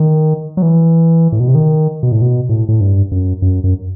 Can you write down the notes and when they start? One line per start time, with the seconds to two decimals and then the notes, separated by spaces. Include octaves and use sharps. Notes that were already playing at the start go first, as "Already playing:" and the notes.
Already playing: D#3
0.57 F#3
0.62 E3
1.32 A2
1.40 B2
1.48 C3
1.55 D#3
2.03 B2
2.12 A2
2.22 B2
2.49 A2
2.68 A2
2.81 G2
3.12 F#2
3.42 F#2
3.64 F#2